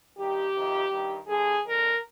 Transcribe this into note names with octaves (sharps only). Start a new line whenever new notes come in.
G2 D#3 G4
F2 C3 D#3
G2 D#3
G2 D3 G#4
F2 D3 A#4